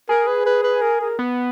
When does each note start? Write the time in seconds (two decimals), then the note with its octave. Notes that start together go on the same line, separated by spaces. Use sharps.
0.09 G#4 A#4
0.27 B4
0.46 B4
0.63 B4
0.82 A#4
1.01 A#4
1.19 B3